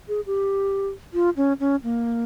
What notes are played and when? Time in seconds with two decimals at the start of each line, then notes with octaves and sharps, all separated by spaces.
0.08 G#4
0.26 G4
1.14 F4
1.37 C#4
1.60 C#4
1.84 A#3